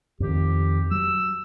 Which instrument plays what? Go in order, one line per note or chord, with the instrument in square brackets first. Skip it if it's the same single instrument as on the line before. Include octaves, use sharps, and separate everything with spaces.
[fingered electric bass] F2 D#3 [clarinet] G4
[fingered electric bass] F#3 [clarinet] E6